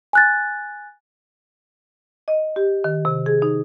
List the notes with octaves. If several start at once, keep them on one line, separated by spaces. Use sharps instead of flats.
G#5 F#6 A6
D#5
G4
D#3
C3
G#4
D#4